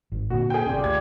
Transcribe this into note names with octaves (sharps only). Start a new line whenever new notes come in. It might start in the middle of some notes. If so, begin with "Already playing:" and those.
G#1
A#2 D3 F#4
G#4 G5
G1 C#3 C#4 D4 F4 G4
D2 G#6